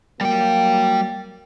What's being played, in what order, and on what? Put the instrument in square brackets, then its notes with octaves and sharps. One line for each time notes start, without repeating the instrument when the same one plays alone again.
[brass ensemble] F#3 A#3 [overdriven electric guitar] G3 G5